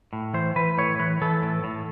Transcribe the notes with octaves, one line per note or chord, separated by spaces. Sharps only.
A2
E3 C5
E3 B4
A2 C#5
E3 B4
E3 A4
A2
A2